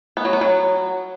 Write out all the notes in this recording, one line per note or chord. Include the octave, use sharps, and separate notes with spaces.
B3
F#3
B3
F#3